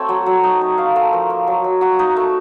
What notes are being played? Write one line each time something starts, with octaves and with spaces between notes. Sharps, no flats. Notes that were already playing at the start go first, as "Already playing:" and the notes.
Already playing: A3 C4 C#5 A5
F#3
F#3
D#4
D#4
D#4 F5
A3 F#5
F3 A#4
A#3
F#3
F#3
F#3 F#4
D#4
A3